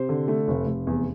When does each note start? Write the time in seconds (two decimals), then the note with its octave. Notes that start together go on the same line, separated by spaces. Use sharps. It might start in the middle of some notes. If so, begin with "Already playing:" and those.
Already playing: C3 C5
0.09 D3
0.28 A3
0.48 F1
0.67 F1
0.87 E2